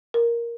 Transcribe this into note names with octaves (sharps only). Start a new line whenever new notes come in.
A#4